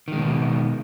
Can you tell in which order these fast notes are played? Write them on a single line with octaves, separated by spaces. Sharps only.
D#3 G#3 B2